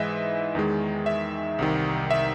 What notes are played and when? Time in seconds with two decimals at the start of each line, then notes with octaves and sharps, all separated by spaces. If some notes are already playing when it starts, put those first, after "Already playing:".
Already playing: G#2 E3 G#3 D#5 E5
0.55 E2 D#3 G#3
1.06 E5
1.59 C2 C3 D#3
2.10 E5